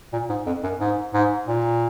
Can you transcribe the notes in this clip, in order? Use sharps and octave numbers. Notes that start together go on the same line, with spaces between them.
A#2
G#2
F2
F#2
G#2
G#2
A#2